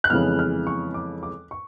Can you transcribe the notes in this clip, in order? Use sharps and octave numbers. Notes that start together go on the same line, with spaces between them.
F#6
F2 C#3 E3 G#3 B3 F6
F6
C#6
D6
D6
C#6